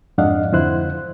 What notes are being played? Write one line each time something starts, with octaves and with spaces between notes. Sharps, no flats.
F2 G#2 D4 D#5 F5 F#5
F2 D3 E4 C5 F#6